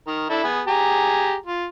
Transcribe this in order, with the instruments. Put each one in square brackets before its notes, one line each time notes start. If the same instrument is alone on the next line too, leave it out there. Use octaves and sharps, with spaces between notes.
[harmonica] D#3 A#4
D4 E4 A4
B3 G#4
G4 G#4 A#5
F4